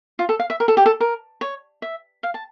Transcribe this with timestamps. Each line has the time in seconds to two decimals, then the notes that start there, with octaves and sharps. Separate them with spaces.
0.19 F4
0.29 A4
0.39 F5
0.50 E5
0.60 A#4
0.68 A4
0.77 G4
0.86 A4
1.00 A#4
1.41 C#5
1.82 E5
2.23 F5
2.34 A5